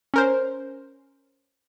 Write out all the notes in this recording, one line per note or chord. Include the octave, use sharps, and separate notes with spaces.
C#4 A#4 C5